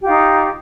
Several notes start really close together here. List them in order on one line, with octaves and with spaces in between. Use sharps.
G4 F4 D#4